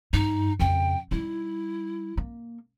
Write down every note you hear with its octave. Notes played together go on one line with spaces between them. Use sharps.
G2 D#4
F2 C#3 G5
G3 D#4 E4
A#3